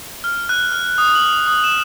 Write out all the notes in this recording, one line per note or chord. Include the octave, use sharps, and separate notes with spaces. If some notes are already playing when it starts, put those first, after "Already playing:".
F6
F#6
F6
D#6
F#7
D#6
E7